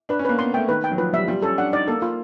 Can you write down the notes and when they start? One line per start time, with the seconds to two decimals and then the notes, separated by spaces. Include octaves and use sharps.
0.09 D4 B4
0.19 C#4
0.25 A#3 B4
0.39 B3 C6
0.54 A3 G5
0.69 D#3 B4
0.84 G5
0.92 F#3
0.98 F3 B4
1.13 G3 E5
1.28 G3 F4
1.43 C#4 A4
1.58 D4 F#5
1.73 D#4 D5
1.88 A#3 A4
2.02 F4